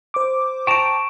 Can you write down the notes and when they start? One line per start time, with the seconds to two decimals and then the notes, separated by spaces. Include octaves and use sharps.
0.14 C5 D6
0.67 G5 A5 A#5 C#6 D7